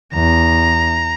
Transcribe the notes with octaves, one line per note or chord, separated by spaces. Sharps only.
E2 A#5